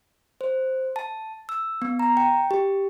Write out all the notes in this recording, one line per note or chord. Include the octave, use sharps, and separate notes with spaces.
C5
A5
E6
B3
A#5
G5
G4